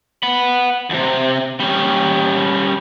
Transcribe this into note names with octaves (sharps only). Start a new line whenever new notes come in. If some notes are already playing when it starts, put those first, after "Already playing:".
F#5 B5
D#2 C3
G3 C#4